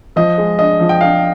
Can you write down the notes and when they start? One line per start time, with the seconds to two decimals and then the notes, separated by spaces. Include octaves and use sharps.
0.16 F3 D#5
0.38 G#3
0.59 D4 D#5
0.80 F3
0.89 G5
1.01 D4 F5